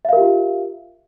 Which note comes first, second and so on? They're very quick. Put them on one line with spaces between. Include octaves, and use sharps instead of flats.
E5 F5 A#4 G4 F4